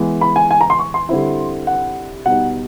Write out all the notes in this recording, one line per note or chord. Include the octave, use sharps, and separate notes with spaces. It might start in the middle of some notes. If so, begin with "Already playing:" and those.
Already playing: E3 G#3 B3
B5
G#5
G#5
A#5
C6
C#6
C6
D3 G3 C4 E4
F#5
B2 G3 B3 D#4 F#5